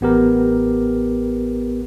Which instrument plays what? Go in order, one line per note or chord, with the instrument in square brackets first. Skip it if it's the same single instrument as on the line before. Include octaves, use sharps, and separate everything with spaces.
[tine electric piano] A1 B3 G4 A#4